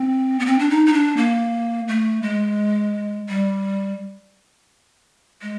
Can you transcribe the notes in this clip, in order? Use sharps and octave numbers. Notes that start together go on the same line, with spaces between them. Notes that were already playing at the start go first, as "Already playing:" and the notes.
Already playing: C4
B3
C4
D4
D#4
D#4
D4
A#3
A3
G#3
G3
G#3